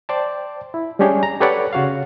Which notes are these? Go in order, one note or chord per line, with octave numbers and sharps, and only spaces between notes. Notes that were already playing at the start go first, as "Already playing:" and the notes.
C5 D5 G5 A5
E4
G3 G#3 C#4 D4 G4 G#4
A#5
G4 A4 B4 C#5 D5 F#5
C#3 F#4 C#5 F5